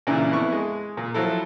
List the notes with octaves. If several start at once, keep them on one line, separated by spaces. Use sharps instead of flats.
A#2 C#3 E3 D4 E4
F2 B3 E4 C#6
G#3
A#2
F3 F#3 E4 A4